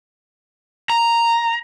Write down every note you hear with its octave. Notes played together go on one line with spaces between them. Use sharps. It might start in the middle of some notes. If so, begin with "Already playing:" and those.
A#5